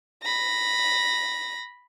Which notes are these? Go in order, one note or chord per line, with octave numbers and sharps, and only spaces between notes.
B5 A#6